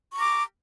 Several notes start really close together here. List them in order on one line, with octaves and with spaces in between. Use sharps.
C#6 A#5 D6